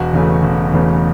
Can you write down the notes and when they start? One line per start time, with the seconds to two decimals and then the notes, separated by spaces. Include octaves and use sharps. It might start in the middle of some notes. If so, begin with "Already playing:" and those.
Already playing: E1 F#4
0.13 E2 C#3 A3
0.44 E1
0.73 E2 C#3 A3